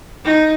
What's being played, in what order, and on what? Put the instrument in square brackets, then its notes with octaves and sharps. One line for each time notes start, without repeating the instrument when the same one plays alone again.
[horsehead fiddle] D#4